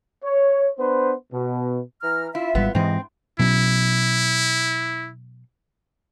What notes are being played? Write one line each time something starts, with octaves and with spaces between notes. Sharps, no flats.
C#5
B3 D4 B4 C5
B2
E3 A#5 F6
E4 F4 E5
G#1 G3 B3
G#2 C3 E3 C4 D#5
B2 F#3 C#4 E4